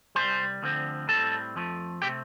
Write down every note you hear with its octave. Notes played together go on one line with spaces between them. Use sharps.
C2 C3 G3 C5 C6
D2 D3 F3 C4
A2 G3 C4 A4 A5
F2 F3 A3
C3 A3 C4 G4 G5